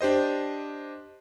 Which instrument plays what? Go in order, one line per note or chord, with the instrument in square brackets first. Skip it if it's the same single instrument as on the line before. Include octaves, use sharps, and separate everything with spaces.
[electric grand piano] D4 G4 C5 D#5